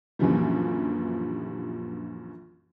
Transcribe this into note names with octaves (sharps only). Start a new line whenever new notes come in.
A#1 F#2 D3 E3 F3 G3